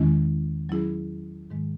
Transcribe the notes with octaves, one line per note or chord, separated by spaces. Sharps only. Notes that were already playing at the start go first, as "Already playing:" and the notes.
Already playing: E2 D#3 G#3 C#4 E4
F#3 C#4 E4 G#4
G#2 D#3 G#3